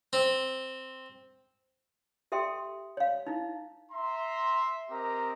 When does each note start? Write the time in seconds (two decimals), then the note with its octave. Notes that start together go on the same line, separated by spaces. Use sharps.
0.13 C4
2.32 G4 A4 E5 G5 C6
2.97 C#5 F5
3.27 D#4 E4
3.91 E5 A#5 C6
4.90 C4 G4 A#4 D#5 A#5